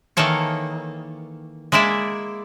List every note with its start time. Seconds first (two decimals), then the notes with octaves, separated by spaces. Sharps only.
0.17 D#3 E3 A#3 A4 C#5
1.72 G#3 A#3 E4 D5 E5